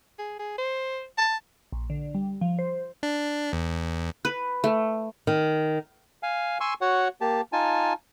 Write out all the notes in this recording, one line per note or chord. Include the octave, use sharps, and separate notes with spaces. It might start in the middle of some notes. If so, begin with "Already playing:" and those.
G#4
G#4
C5
A5
A#1
D3
G3
F3
C5
D4
E2
B4
A3
D#3
F5 G#5
G#5 C6 C#6 E6
F#4 C#5 F#5
A#3 G4 A5
D#4 F4 G#5 A5